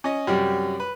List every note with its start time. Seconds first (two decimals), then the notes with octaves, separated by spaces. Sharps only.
0.04 C#4 D#5
0.27 F#2 C3 G3
0.80 B4